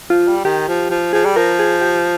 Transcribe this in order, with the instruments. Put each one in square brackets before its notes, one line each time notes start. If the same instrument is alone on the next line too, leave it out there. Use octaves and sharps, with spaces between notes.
[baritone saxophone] F3 [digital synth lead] F4
[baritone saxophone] G3
[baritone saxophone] D#3 [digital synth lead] G4
[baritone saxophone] F3
F3
[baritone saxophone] F3 [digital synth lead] G#4
[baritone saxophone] G3
[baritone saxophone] F3 [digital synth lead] A#4
[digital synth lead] G#4
G4